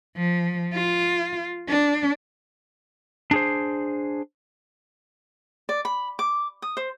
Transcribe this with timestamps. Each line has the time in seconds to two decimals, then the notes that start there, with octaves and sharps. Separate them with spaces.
0.17 F3
0.74 F4
1.69 D4
3.31 D4 G#4 C5
5.69 D5
5.85 B5
6.19 D6
6.62 D#6
6.77 C5